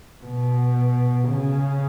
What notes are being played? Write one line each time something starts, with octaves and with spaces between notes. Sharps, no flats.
B2
C#3